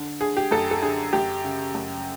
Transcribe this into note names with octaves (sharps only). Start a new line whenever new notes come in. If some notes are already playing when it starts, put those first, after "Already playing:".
Already playing: D3
D3 G#4
G4
F#2 A4
A4
D3 G#4
F#2 G4
C#3
F#2